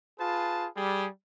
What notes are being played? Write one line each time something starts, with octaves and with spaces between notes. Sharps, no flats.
F4 G#4 B4 A5
G3 G#4